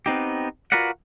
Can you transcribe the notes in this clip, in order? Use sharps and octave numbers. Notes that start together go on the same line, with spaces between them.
B3 C4 D#4 G4
F4 F#4 A#4 B4 D5 F#5